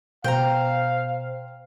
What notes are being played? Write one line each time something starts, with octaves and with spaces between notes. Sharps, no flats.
B2 C5 F5 G5 A#5